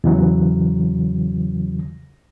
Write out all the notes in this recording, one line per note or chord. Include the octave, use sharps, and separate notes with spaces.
E2 C#3 E3 F#3